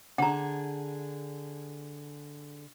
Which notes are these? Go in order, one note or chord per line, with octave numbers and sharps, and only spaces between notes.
D3 G#4 F#5 A#5